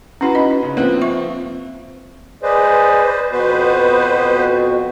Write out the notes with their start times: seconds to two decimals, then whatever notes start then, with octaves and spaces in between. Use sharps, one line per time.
0.21 C#4 E4 F#4 B4 F#5
0.35 D#4 D#5
0.62 C#3
0.77 F3 A#3 C4 B4
1.01 E5 C#6
2.43 G#4 B4 C5 D5 D#5
3.32 F2 B2 B3 F#4 B4 C5